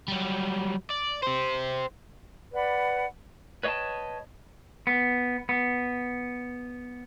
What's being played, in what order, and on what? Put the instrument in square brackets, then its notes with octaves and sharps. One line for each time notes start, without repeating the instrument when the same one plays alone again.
[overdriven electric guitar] F#3 G3
D5
G4 C5
[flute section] B4 D5 F#5 B5
[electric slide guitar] B4 C#5 D#5 F5 G5 A5
[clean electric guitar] B3
B3